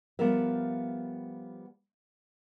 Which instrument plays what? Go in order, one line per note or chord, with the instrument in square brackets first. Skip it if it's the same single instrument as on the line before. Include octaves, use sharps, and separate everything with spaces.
[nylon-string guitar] F3 G3 B3 F4 A#4 E5